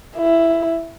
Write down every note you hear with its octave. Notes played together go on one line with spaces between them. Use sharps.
E4